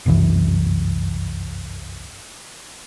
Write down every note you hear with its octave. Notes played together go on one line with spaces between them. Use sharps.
G1 C2 F#2 E3